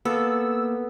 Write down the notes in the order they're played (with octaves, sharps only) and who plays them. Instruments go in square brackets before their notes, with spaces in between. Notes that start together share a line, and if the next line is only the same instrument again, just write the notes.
[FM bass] A#3 [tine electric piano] B3 [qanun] A4 [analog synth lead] E6